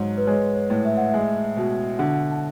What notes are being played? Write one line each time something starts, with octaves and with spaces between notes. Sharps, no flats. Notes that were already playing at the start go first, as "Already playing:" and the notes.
Already playing: G#2 F#3 C#5
B4
G#3 C#5
C#5
A2
E5
F#5
G#3 E5
B2
D3 F#5
A5